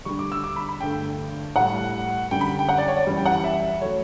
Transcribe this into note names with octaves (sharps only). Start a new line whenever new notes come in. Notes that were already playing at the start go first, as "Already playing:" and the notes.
D2 D3 G3 C#6
D6
E6
D6
B5
B5
G2 D3 A3 G5
A2 G3 F#5
F#2 D3 G3 G5
B5
G5
F#5
D5
C#5
D5
F#2 E3 G3
G5
F#5
E5
F#3 A3 C#5